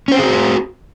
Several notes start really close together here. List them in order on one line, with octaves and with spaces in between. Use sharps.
C#4 C5 C4 G#4 F#4